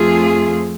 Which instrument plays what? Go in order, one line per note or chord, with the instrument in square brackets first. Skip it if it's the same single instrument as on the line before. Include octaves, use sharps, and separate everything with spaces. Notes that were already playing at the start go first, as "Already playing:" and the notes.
Already playing: [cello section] F2 F3 A3 F4 G#4